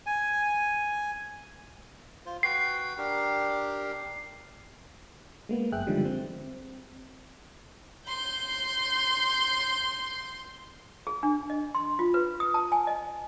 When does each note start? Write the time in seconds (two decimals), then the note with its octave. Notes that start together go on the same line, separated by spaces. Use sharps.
0.06 G#5
2.26 F4 C5
2.43 F#4 B4 G5 C7
2.98 D4 G4 A#4
5.49 G#3 A#3 B3
5.72 G1 F#2 G#4 E5 G5 F#6
5.87 D3 D#3 F3 G3 G#3
6.05 C4
8.08 C6 G6
11.07 G#4
11.23 D4
11.50 D#5
11.75 C6
11.99 F4
12.14 B4
12.40 D#6
12.54 A5
12.72 G#5
12.87 D#5